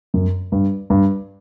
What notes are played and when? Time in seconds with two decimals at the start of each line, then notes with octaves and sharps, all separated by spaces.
0.14 F#2
0.52 G2
0.90 G2